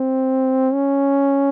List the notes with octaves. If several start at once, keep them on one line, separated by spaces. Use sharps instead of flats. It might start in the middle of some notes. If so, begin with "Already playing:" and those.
Already playing: C4
C#4